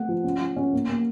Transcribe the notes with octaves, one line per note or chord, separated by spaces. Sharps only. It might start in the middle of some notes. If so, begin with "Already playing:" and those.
Already playing: A3 C4 F#5
F3
C#4
F3
C#4
A#3
A#3